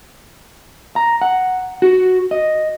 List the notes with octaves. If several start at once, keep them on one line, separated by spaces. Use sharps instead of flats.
A#5
F#5
F#4
D#5